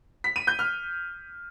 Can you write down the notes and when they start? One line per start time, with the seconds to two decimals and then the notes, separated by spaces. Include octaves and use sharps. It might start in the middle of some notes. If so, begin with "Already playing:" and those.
0.24 B6
0.36 D#7
0.47 G6
0.59 F6